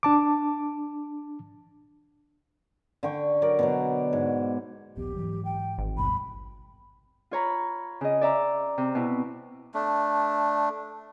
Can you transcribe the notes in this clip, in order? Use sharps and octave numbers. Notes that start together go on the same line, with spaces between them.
D4 A5 D6
D3 G5 C#6
F#3 A#4 D5
B2 D3 F#3
G#2
D#1 A#1 B3 G4
G#2 E3 F#3
G5
G#1
C#2 G2 B2 B5
F4 C#5 A#5 B5
C#3 D#5
D5 E5 A#5 D6
C3
B2 E4
A3 D4